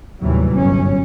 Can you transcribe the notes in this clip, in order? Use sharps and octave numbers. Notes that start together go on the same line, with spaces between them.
D#2 A2 C3 E3 F#3 G3
G1 F#2 C#4